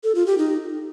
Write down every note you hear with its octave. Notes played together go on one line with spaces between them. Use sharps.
A4
F4
G4
D#4